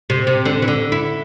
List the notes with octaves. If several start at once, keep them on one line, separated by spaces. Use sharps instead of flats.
C3
C3
D3
E3
D3
E4